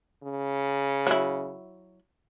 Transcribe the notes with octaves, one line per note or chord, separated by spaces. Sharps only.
C#3
F#3 E4